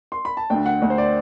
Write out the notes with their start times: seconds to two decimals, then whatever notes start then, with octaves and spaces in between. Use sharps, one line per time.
0.12 C6
0.25 B5
0.37 A5
0.50 D2 D3 G5
0.66 F#5
0.82 D2 D3
0.90 C5
0.98 D5